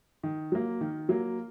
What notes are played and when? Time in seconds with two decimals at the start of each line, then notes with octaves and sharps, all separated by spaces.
0.23 D#3
0.52 F#3 A#3
0.81 D#3
1.09 F#3 A#3